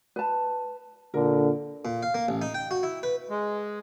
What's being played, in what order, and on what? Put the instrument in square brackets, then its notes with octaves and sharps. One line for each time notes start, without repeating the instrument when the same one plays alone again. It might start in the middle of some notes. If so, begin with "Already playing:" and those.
[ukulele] B4 A5
[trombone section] A#2 D3 [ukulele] A#4
[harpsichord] A#2
F5
A#3
A1
D#4
G5
F#4
E4
B4
[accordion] G#3